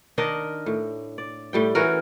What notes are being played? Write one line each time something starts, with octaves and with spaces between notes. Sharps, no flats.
D#3 D4 A#4 D#5
A2
D5
A2 G3 G5
E3 C#4 F#4 A#4